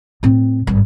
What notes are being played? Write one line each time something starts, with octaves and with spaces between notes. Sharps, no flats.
A2 C4
G#1 G2